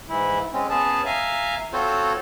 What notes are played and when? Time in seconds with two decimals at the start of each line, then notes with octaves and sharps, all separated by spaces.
0.09 G#2 E3 E4
0.53 G#3 C4 C#4
0.70 B3 C#4 G#4 A5
1.06 E5 F5 G#5 A#5
1.73 C4 F4 F#4 A4 C5 C#5